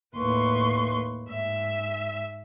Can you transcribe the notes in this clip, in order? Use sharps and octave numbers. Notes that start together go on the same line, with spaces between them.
D#2 A2 B4 C6 C#6
G#2 E5